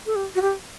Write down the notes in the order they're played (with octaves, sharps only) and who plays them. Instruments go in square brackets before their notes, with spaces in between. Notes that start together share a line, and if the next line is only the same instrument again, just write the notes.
[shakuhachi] A4
G4
F#4
G4